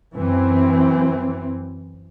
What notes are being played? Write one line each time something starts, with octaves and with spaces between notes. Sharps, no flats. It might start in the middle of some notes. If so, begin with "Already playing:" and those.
F#2 E3 C4